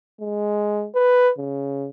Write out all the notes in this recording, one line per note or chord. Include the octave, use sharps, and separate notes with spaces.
G#3
B4
C#3